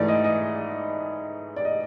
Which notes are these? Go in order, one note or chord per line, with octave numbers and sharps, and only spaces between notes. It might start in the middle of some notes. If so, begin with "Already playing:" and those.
Already playing: G#2 E3 A3 D5
D#5
D#5
D5
D#5